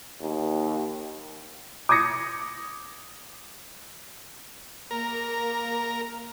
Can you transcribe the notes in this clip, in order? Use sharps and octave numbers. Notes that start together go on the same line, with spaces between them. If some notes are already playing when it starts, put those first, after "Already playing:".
D#2
D6 D#6 G#6 A#6 C#7
A#3 A#4